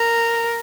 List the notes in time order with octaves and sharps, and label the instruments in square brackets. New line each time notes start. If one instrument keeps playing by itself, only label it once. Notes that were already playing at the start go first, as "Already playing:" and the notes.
Already playing: [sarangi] A#4